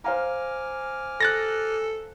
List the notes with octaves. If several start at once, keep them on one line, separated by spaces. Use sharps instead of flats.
C5 F5 G#5 A#5 D6 F6
A4 F#6 A6 A#6